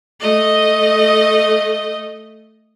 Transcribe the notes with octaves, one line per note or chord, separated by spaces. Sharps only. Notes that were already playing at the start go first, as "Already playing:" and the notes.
A3 D#5